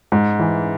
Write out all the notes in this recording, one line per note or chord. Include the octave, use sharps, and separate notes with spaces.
G#2
E3